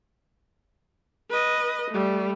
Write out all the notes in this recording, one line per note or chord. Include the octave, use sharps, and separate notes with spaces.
B4 D#5
G3 A3